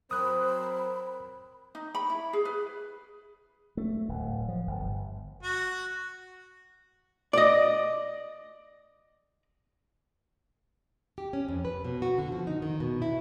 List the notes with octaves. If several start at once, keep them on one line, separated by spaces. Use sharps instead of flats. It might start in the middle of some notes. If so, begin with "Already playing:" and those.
F#3 C4 A#4 C5 B5 D#6 F#6
D#4
B5
E4
G#4
B4
A3
D1
F3
G1
F#4
D5 D#5
G4
C#4
F2
B4
B2
F#4
D3
F3
D#4
D#3
B2
E4